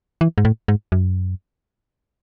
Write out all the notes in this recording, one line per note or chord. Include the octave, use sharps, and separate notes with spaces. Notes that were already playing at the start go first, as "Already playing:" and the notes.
E3
G#2
A2
G#2
F#2